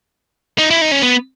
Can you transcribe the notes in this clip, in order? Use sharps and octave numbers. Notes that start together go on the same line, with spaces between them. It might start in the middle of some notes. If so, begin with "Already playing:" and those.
D#4
E4
D#4
C#4
B3